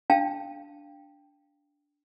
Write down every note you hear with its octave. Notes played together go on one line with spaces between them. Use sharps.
D4 F5 G5 A5